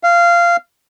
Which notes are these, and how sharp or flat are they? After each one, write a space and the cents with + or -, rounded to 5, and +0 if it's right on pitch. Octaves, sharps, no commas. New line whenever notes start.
F5 -15